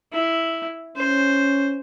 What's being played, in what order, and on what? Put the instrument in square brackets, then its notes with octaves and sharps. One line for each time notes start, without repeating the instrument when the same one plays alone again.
[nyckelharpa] E4
[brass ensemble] C#4 [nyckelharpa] C5